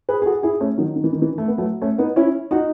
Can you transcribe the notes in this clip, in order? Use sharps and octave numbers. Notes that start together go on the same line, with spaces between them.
G#4 B4
G#4
F#4 A4
E4 G#4
A3 C#4
D#3 F#3
D#3
E3
D#3
E3
A3
B3
F#3 A3
A3 C#4
B3 D#4
C#4 E4
D#4 F#4